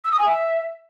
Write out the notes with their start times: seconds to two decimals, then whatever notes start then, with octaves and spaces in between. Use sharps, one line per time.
0.04 E6
0.11 D#6
0.18 G#5
0.26 E5